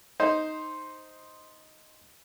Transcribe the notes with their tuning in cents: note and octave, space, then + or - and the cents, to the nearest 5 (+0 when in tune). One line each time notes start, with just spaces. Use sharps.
D#4 +0 C5 +0